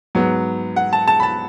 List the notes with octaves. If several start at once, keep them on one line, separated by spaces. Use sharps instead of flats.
G#2 F#3 B3
F#5
A5
A5
B5
A5